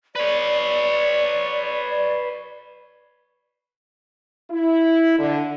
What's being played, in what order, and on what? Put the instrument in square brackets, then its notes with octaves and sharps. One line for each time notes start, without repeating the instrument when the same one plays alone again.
[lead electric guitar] B4 C#5 [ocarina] D5
[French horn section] E4
D3